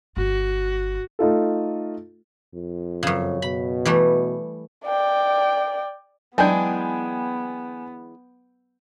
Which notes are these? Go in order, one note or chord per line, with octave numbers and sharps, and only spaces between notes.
G1 F#4
A3 D#4 F4 A4
F2
F#2 C#3
B2 B5
E3 G3 A3
D5 G5
E3 F#3 G#3 B3 D4 G5 G#5 G6